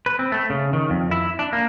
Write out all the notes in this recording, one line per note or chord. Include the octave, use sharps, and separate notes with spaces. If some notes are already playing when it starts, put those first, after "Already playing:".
B4
C4
A3
C#3
D#3
F2
E4
D4
A#3